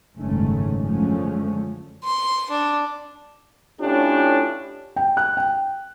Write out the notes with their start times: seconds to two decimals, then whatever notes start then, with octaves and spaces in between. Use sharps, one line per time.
0.18 F#1 C2 G#2 D#3 A3 C#4
0.79 F#2 D3 F3 G#3 A3 C#4
2.04 C6
2.50 D4
3.80 A2 C#4 D4 F4 G4
4.96 G5
5.17 F#6
5.37 G5